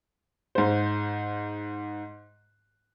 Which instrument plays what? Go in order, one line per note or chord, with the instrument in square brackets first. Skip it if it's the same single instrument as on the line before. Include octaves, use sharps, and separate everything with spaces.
[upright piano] G#2 C5